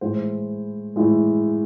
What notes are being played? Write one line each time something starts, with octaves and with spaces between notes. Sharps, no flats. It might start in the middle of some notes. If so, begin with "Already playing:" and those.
A2 E3 G#3 C5
A2 E3 G#3